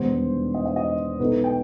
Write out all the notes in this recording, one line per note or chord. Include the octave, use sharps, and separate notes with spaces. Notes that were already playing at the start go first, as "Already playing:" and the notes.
Already playing: E1 D#2 D#3 G3 B3 C5
D#5
D#5
D#5
B1 B2 A3 D#4 B4
G5